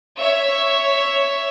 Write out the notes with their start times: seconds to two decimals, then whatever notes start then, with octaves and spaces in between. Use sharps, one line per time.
0.18 C#5 E5